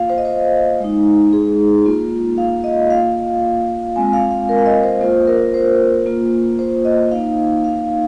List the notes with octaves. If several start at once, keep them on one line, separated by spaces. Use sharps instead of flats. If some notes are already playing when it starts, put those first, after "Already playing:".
Already playing: A#3 F4 F5
C5
D#5
C5
G#3 D#4
G#4
A#3 F4
F5
D#5
A#3 F4 F5
G#3 C4 F4 G#5
F5
F5
A#4
F5
D#5
C5
A#3 F4 C5
A#4
C5
A#3 F4
C5
D#5
A#3 D#4 F5
F5